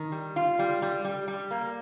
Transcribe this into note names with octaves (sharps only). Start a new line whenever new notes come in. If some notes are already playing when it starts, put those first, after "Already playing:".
Already playing: D#3
G3
F4
G3
G3
G3
G3
A#3